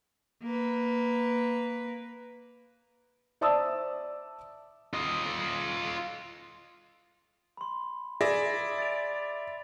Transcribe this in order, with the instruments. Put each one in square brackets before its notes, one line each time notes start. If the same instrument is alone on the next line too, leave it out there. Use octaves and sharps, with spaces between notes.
[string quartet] A#3 B4
[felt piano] C5 D5 E5 A5 D#6 E6
[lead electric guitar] F4 D#5
[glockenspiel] B5 C6
[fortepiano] G#4 [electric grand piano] D5 E5 A#6 [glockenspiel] B5
[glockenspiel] A6 D7 F7